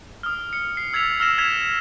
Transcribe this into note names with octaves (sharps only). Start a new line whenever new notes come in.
D#6 F6
C#7
C7
E6 G#6 A6 B6 F7
E6 F6 A#6 E7
E6 F6 G#6 B6 E7 F7